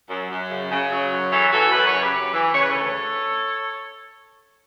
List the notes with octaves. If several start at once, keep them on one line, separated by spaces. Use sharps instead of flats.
F#2
F#2
C#3
C#3
F#3
F#2
E3 A4 C#5
E3 F#4 A4
F#2 B4
C#5
C#3
G4 B4
F#2
E3
C#3 C#5
B4
D2 A4 C#5